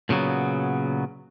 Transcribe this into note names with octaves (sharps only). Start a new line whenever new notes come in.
A#2 C#3 F3 F#3 B3